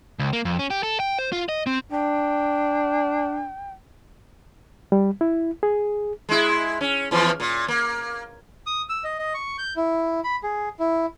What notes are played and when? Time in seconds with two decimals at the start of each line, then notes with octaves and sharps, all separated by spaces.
0.19 C#2
0.33 A#3
0.45 F2
0.59 C#4
0.70 G4
0.83 A4
1.00 G5
1.19 C5
1.32 F4
1.49 D#5
1.67 C4
1.91 D4 G5
4.92 G3
5.21 E4
5.63 G#4
6.29 G#3 E4
6.81 C#4
7.11 E2 E3 F3
7.40 A#2
7.68 A#3
8.67 D#6
8.89 E6
9.04 D#5
9.19 D#5
9.34 C#6
9.58 G6
9.76 E4
10.24 B5
10.43 G#4
10.79 E4